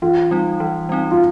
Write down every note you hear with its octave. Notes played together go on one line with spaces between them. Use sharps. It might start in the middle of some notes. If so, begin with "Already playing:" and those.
E3 F4
G3 C4 D#4
E3
G3 C4 D#4
F4